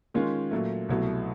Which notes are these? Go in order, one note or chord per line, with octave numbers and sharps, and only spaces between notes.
D#3 G#3 C#4 F4
A#2 F#3 A3
C2 B2 F#3 A3